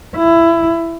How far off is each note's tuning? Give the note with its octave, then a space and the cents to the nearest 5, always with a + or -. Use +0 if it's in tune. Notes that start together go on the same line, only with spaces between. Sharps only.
E4 +20